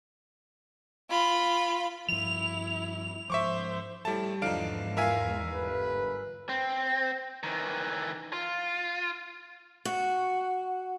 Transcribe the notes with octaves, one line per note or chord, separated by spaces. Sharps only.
F4 B5
G2 F3 E4 F7
G#2 F3 C5 E5 C#6 D6
A2 G3 A3 A5
E2 G#2 D3 F3 D4 D#4 F5 D7
F4 A#4 E5 F5 G#5
G1 B4
C4
D#3 E3
F4
F#4